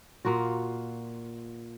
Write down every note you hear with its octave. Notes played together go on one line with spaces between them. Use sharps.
A#2 A#3 F4 F#4